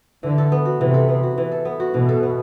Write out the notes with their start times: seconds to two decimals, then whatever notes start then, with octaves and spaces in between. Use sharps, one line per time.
0.23 D3 E3
0.38 A4
0.52 B3
0.65 F#4
0.80 C3 E3
0.94 A4
1.09 B3
1.23 F#4
1.38 E3
1.52 A4
1.65 B3
1.80 F#4
1.94 B2 E3
2.09 A4
2.23 B3